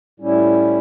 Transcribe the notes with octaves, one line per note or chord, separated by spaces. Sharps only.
A2 G3 C#4 E4